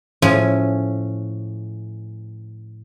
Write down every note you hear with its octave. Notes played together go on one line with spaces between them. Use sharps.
A2 F3 C#4 G#5